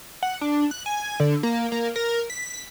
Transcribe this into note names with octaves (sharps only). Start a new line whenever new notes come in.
F#5
D4
F#6
G#5
D3
A#3
A#3
A#4
B6